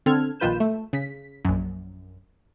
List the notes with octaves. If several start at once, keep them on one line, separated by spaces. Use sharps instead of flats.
D3 C4 A4 F6 G#6
A#1 D#3 F4 B4 G6 E7
A3
C#3 B6
A#1 F#2